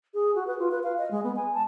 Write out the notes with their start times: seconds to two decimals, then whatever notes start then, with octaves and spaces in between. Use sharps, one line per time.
0.14 G#4
0.35 F#4
0.47 B4
0.59 F4
0.71 B4
0.83 F5
0.98 D#5
1.11 G#3
1.24 B3
1.36 G#5
1.54 A5